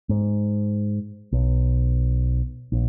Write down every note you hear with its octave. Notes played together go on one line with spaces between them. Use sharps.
G#2
B1
A#1